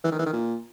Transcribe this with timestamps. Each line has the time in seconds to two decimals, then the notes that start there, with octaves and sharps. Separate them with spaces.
0.04 E3
0.11 D#3
0.19 E3
0.26 D#3
0.33 A#2